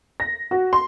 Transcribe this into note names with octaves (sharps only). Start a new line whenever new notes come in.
A#6
F#4
C6